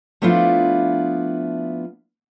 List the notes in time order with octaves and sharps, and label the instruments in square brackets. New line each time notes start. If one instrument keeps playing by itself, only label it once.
[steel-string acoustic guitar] F3 A3 B3 D4 E4 F4